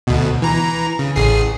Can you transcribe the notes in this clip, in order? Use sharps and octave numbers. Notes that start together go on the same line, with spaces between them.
D2 B2
E3 A#5
C#3
A1 G#4 C7